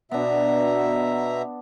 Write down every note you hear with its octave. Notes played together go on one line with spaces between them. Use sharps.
B2 B3 D4 E5 A#5